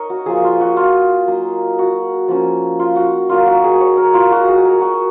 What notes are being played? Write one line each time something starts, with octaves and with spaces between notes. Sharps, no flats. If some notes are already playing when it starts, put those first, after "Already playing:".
Already playing: D#4 A#4 C#5 D#5
F#4
F3 A#3 F4 G#4
F4
F#4
F4
F#3 A#3 D#4
F#4
F3 A#3 C#4
F4
F#4
F#3 A#3 D#4 F4
F#4
G#4
C#5
A#4
F4
G#3 D#4 F#4
G#4
A#4
F#4